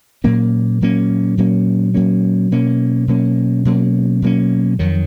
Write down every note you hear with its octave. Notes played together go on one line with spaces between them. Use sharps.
A#2 F#3 A#3 C#4
A#2 F#3 A#3 C#4
A#2 F#3 A#3 C#4
A#2 F#3 A#3 C#4
B2 F#3 A#3 C#4
B2 F#3 A#3 C#4
B2 F#3 A#3 C#4
B2 F#3 A#3 C#4
F2 D#3 F#3